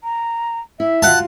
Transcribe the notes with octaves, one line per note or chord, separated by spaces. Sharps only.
A#5
E4 E5
F4 F#4 F5 F#5 A5